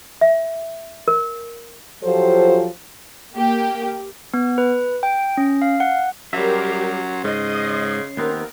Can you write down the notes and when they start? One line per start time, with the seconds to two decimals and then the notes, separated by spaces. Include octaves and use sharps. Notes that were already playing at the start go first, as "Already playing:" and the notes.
0.21 E5
1.08 A#4
2.03 F3 F#3 F4 G4 A4 C5
3.35 A#3 G4
4.34 B3
4.58 B4
5.03 G5
5.37 C#4
5.62 F5
5.80 F#5
6.33 F#3 G3 C#4 G4 A#4 E5 C6
7.24 G#2 C#3 D#5
8.17 D#2 B3 C4 A#4